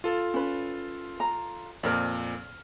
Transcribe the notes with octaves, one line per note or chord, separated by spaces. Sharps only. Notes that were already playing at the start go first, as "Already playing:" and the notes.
F4 A4
C#4 B4
A#5
F2 A#2 A#4 C5 D5 F6